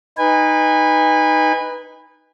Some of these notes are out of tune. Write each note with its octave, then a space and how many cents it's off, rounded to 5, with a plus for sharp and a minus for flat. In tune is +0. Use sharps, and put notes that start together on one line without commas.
D#4 +0 B4 +0 G#5 -30